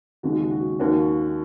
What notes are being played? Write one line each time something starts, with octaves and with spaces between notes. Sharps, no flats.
D#2 C#3 G#3 F#4
F#4
F#4
D#2 D#3 A#3 C#4 F#4